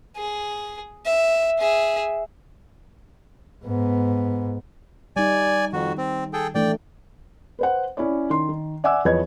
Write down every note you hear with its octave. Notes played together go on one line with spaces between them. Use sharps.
G#4
E5
G#4 E5
G#2 B3
G3 D#4 D5 G#5
F2 D#3 F#4
C4
G#4 A4 G5
E3 A3 D4 D5 G5
B4 C5 F#5
C#4 E4 C#5 D5
D#3 C6
D#3
D5 E5 F#5 G#5 D6 E6
E2 F3 B4 C#5 D#5 G#6